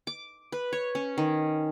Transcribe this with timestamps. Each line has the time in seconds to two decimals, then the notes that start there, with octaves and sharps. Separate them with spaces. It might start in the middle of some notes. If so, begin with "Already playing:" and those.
0.07 D6
0.52 B4
0.73 C#5
0.95 C#4
1.18 D#3